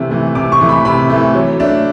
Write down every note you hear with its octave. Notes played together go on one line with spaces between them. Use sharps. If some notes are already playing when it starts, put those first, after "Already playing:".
Already playing: C3 E3 A3
E3 A3
C3 D6
C#6
E3 A3
B5
C3 B5
E3 A3
F#3
A3 D4